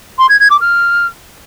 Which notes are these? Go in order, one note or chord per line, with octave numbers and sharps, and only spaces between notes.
C6
G#6
G#6
D6
F6